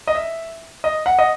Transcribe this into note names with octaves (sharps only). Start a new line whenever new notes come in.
D#5
E5
D#5
F#5
D#5